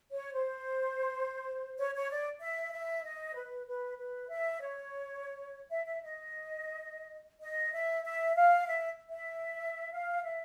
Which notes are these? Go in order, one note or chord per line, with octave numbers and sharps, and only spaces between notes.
C#5
C5
C#5
C#5
D5
E5
E5
D#5
B4
B4
B4
E5
C#5
E5
E5
D#5
D#5
E5
E5
F5
E5
E5
F5
E5